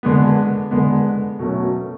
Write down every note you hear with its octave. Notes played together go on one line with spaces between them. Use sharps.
D3 G#3 B3
D3 G#3 B3
B2 F#3 A3 C#4